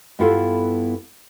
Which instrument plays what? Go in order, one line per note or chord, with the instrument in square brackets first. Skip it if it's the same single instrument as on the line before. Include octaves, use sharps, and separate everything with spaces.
[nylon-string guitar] G2 B3 E4 F4 A4 F5